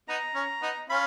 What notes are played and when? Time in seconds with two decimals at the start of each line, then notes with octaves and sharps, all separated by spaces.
0.08 B3 D#4 A#5
0.35 C#4
0.62 B3 D#4
0.89 C#4 F4 B5